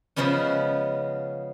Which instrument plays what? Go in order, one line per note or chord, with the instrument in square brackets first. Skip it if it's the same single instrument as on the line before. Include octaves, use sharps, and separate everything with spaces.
[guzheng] C#3 F3 G#3 B3 C#4